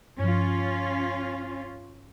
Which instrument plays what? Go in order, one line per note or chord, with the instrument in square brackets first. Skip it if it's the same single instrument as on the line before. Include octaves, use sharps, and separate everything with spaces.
[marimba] G2 F3 [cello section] C#4 F4